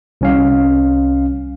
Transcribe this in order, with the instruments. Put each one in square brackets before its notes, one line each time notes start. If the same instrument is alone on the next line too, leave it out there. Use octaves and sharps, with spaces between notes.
[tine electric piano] C2 C#4 F5